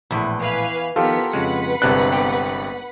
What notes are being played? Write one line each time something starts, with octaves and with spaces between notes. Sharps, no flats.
A#1 E2 A2 E3
B4 F5 G#5
D#3 F3 B3 F4 G4 A4 A#4 B6
F2 C#3 G#3 B4 F#5 B5
G1 C3 G#3 B3 D4 F#6
G4